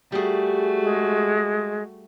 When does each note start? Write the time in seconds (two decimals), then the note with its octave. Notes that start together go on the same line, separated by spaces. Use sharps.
0.12 G3 A3 F#4 G#4
0.83 G#3